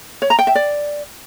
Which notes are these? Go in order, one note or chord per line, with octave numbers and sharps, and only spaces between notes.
C#5
A#5
G5
E5
D5